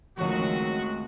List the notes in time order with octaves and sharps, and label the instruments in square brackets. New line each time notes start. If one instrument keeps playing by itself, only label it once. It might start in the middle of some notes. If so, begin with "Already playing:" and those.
[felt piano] C#2 C#6 [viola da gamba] D#3 A3 C4 [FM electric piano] F3 C#5 [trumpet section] F#4